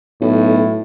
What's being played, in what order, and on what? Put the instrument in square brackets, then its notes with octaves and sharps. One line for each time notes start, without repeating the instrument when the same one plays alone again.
[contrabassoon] B1 [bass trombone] A2